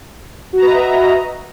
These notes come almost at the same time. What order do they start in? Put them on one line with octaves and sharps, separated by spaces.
F#4 A#5 B4 D#5 E5